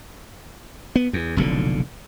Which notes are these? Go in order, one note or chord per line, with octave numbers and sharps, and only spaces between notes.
B3
E2
F1 B1 A#2 D3